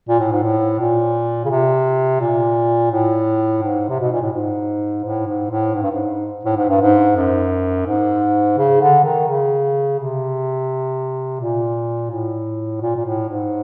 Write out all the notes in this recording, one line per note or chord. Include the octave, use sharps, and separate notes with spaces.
A#2
A2
G#2
A2
A#2
C#3
C3
A#2
A2
G#2
C3
B2
A#2
A2
G#2
A2
G#2
A2
G#2
G2
G#2
A2
G#2
G2
G#2
F#2
G#2
C#3
D3
D#3
C#3
C3
A#2
A2
A#2
A#2
A2
G#2